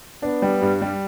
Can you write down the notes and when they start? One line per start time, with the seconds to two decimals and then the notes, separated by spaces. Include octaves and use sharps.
0.22 B3 D4
0.42 G3
0.62 G2
0.82 G3